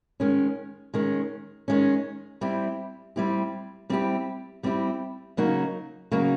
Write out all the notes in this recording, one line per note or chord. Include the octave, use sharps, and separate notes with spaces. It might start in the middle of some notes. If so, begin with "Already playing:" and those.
D#3 G#3 C#4
D#3 G#3 C#4
D#3 G#3 C#4
G3 C4 E4 G4
G3 C4 E4 G4
G3 C4 E4 G4
G3 C4 E4 G4
C#3 F#3 A#3 D#4 F#4
C#3 F#3 A#3 D#4 F#4